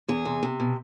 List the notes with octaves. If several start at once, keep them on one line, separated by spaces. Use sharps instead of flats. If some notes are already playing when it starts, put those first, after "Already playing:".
E2 G#4
C3
C3
B2